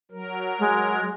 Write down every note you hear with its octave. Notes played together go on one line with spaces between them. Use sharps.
F#3 A#4
G#3